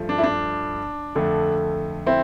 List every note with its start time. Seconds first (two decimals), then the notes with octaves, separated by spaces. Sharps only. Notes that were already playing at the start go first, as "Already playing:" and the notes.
Already playing: G2 F3 A3
0.09 D4
0.18 E4
0.24 D4
1.15 F2 D3 A3
2.06 C4 E4